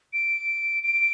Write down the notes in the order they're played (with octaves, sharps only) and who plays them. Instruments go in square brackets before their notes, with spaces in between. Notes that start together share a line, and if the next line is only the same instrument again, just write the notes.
[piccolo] D7
D7